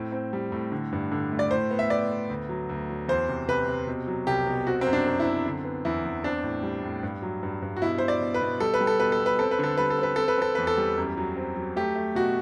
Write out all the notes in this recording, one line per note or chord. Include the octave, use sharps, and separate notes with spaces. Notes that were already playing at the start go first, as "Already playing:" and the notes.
Already playing: A2 C4
C4
G3
A2
D3
G2
D3
A3
D5
A2 C5
B3
E5
B3 D5
B3
D2
F#3
D2
F#3
E2 C5
C3
C3 B4
C3
B2
F#3
C2 G4
B2
C4 F#4
C4
F#2
D4
F#2
E4
C4
D3
B3
E2 E4
E2
C4 D4
A2
G3
A2
G2
F#3
G2
G2
F#4
B2 E4
B2 C5
D5
B2
B4
B2
G3 A4
B4
G3
A4
B2 B4
A4
B3
B4
C4 A4
B4
D3 A4
G3 B4
A4
C4 B4
C4 A4
B4
C4 A4
E2 B4
A4
G3
F#2
F#3
C4
F#3
A3 G4
A3
B2 F#4